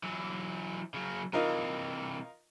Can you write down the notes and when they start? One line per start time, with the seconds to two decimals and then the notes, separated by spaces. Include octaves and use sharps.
0.03 E3 F#3
0.94 C#3 F#3
1.33 C3 E3 D#4 F4 A#4